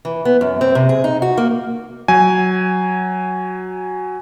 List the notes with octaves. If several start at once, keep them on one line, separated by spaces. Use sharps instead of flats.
E3
B3
F#2
C4
C3
G#4
D#4
F#4
A#3
F#3 G#5